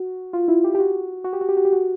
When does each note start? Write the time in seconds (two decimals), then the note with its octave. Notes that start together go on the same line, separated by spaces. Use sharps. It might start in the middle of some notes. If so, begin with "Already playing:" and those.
Already playing: F#4
0.33 F4
0.48 E4
0.64 G4
0.75 G4
0.79 F#4
1.24 F#4
1.33 G4
1.41 F#4
1.49 G4
1.57 F#4
1.65 G4
1.73 F#4